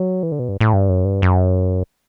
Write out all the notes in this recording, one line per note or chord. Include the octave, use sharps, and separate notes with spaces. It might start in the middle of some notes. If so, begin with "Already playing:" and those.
Already playing: F#3
E3
D3
B2
G2
A2
G2
F#2
G2
F#2